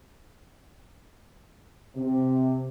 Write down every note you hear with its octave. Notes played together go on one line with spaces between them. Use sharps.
C3